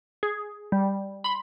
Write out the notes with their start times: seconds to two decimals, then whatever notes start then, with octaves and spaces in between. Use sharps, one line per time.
0.23 G#4
0.72 G3
1.24 B5 C6